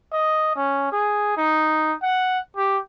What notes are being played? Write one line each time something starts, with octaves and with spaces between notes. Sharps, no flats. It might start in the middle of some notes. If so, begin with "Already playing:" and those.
D#5
C#4
G#4
D#4
F#5
G4